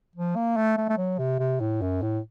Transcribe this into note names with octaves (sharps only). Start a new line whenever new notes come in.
F3
A#3
A3
A3
A3
F#3
C3
C3
A2
F#2
A2